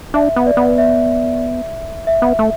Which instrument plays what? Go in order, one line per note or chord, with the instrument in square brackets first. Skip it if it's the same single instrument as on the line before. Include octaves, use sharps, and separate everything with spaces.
[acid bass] D4 [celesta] E5
[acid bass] B3
[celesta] D5
[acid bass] B3
[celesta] E5
E5
[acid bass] B3
A3